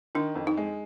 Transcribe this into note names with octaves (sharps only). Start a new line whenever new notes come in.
D#3 D4
F2
D#4
G#3